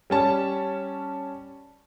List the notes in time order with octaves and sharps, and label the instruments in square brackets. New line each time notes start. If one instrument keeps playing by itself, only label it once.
[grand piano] G3 C#4 A5